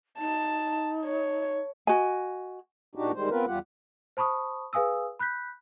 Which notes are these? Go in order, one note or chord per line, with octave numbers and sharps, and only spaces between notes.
D#4 A5
C#5
F#4 D#5 G#5
A#2 D4 D#4 F#4 G4
D#3 G3 G#3 C5
B3 C4 F4 A#4 B4
E2 G3 F4 G4 F#5
C5 A5 B5 C#6 D#6
G#4 B4 F5 G#5 D#6 E6
B5 F#6 G6 B6